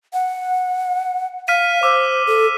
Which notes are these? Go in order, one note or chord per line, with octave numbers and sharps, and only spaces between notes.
F#5
F5 F6 B6 D#7
C5 D6 E6
A4